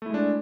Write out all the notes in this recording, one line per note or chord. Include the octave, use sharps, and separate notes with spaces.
G#3 A3 D4 E4